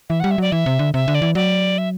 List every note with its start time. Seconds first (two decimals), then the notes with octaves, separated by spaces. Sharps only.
0.10 E3 E5
0.20 G3 F#5
0.31 E5
0.38 F#3 D5
0.52 E3 E5
0.66 C3
0.79 D3
0.94 C3 E5
1.08 D3
1.15 D5
1.22 E3
1.35 F#3 D5
1.78 E5